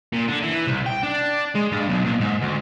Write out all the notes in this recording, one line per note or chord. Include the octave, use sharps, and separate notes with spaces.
A#2
D3
E3
C2
G5
D4
G#3
G2
B1
A#2
G#2
D2